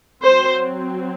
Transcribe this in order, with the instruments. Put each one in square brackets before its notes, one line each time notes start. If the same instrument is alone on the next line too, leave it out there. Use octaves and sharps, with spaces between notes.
[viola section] F#3 C4 C5